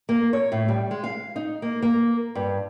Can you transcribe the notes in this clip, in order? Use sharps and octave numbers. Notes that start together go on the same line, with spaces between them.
A#3
C#5
A2
G3
G#3
F5
D#4
A#3
A#3
G2